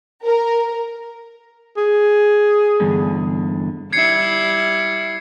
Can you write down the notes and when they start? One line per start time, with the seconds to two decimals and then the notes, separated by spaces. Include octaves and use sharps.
0.23 A#4
1.77 G#4
2.80 E2 G2 D3
3.93 G3 E4 G#6 C7 C#7